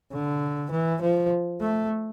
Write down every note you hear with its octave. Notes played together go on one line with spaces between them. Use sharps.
D3
E3
F3
A3